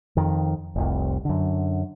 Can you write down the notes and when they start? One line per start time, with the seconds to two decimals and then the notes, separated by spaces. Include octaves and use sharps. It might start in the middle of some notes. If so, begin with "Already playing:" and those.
0.17 F2 D#3
0.75 F1 C2
1.25 F#2 D3